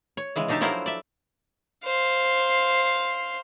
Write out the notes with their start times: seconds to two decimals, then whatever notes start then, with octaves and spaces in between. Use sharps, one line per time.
0.17 C#5
0.36 C#3 E3 G#3
0.48 B2 D4 D#4 G4 E5 A5
0.61 F3 F#3 E4 A4 A#4 C5
0.86 D5 E5
1.85 C5 F5